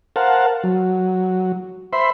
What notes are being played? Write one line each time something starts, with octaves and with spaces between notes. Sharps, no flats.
A#4 C5 F5 F#5 A5
F#3
C5 E5 B5 C6